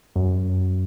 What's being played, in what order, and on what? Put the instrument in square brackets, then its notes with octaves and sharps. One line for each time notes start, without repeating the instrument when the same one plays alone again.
[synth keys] F#2